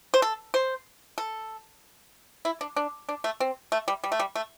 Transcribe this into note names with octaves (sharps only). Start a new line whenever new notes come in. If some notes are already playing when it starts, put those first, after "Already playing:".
C5
A4
C5
A4
E4
D4
D4
D4
A3
C4
A3
G3
G3
A3
G3
A3